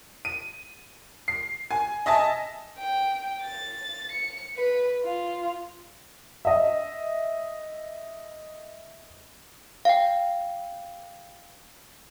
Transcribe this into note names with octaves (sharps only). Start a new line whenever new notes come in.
D#7
C7
G#5
D#5 E5 G#5 A5
G5
A6
C#7
B4
F4
D#5 E5
F5 G5